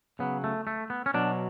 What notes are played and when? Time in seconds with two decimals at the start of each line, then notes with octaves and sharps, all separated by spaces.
0.19 C#3 F#3 B3
0.44 A3
0.67 A3
0.90 B3
1.06 C#4
1.14 B2 F#3 D4